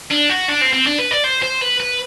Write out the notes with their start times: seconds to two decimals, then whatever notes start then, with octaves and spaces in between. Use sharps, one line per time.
0.11 D4
0.30 F#4
0.49 D4
0.62 C4
0.73 C4
0.87 D4
0.99 B4
1.11 D5
1.24 C5
1.42 C5
1.61 B4
1.80 B4